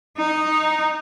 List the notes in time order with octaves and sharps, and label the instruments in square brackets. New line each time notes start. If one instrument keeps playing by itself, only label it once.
[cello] D#4